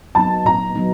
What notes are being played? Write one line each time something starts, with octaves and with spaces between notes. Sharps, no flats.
F#3 B3 D#4 A5
A#2 A#5
F#3 B3 D#4